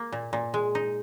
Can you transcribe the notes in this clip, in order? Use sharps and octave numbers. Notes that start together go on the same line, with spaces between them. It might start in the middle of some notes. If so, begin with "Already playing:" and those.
Already playing: A#3
A#2
A#2
G#3
D#4